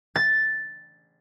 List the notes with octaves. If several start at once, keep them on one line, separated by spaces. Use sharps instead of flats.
A6